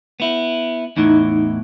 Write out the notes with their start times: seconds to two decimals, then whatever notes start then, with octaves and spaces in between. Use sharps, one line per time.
0.20 B3 E4
0.97 E2 A2 E3 D#4